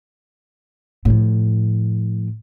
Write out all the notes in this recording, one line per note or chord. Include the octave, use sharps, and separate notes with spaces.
A2 F3